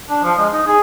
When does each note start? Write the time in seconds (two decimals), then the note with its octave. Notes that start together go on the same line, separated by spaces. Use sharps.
0.10 D4
0.23 F3
0.38 G#3
0.52 D#4
0.67 G#4